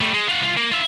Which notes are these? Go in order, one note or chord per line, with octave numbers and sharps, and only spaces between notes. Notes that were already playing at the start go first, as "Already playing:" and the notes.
G3 A3
G#3
F4 F#5
C2 F4
A#3
F4 E5